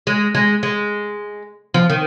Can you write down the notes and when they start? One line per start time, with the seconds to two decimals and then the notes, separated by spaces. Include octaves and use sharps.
0.07 G#3
0.35 G#3
0.63 G#3
1.74 F3
1.90 D#3